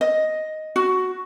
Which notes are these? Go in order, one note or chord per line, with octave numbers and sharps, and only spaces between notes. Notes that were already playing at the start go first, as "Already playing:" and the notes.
D#5
F#4